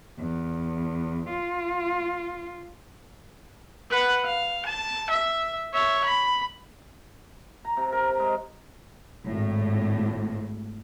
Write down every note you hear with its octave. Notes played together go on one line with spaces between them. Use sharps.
E2
F4
B4 F#5
F5
A5
E5
C#5 E5
B5
A#5
C3
A#4
A#5
G#3
G#1 A2